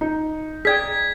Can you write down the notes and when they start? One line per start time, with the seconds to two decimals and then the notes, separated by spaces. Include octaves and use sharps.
0.01 D#4
0.65 G#4 D5 G5 G#6 B6